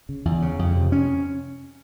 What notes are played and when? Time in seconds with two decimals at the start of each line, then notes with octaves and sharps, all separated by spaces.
0.09 C#3
0.25 E2
0.42 C#3
0.59 F2
0.75 C3
0.92 C#4